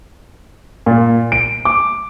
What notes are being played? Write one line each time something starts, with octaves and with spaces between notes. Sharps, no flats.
A#2
D7
D6